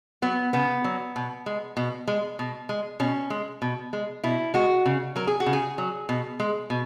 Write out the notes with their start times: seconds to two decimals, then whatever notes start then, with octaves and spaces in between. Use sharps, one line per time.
0.22 F#3 B3
0.53 C#3 B3
0.84 F#3
1.16 B2
1.46 G#3
1.77 B2
2.08 G#3
2.39 B2
2.69 G#3
3.00 B2 C#4
3.30 G#3
3.62 B2
3.93 G#3
4.24 B2 E4
4.54 G#3 F#4
4.86 C#3
5.16 F#3 A#4
5.27 G#4
5.40 F#4
5.46 C#3
5.53 G#4
5.78 F#3
6.09 B2
6.40 G#3
6.70 B2